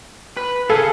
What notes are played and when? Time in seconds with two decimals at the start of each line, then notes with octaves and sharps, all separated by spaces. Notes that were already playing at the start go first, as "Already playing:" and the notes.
0.37 B4
0.70 G#4 A4 F5